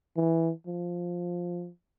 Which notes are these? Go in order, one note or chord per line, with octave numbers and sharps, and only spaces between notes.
E3
F3